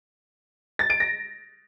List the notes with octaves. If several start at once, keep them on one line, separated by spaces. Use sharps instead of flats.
A6
D7
A#6